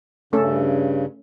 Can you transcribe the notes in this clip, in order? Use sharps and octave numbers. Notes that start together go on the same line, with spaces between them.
G2 C#3 A3 C#4 A4